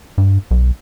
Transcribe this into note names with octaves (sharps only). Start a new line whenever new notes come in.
G2
B1